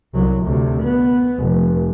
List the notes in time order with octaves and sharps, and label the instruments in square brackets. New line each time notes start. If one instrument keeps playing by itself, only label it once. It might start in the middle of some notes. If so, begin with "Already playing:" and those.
[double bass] C2 F#3
D2 C3
B3
F1